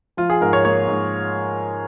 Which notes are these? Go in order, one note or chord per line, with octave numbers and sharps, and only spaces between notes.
F3 F4
G#4
G#2 A#4
C#5
A#3 C#5
G#2